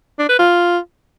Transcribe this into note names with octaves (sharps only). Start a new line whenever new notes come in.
D4
B4
F4